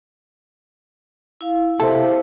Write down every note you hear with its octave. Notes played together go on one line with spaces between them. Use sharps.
E4 F5
C3 A4 C5 E5 A5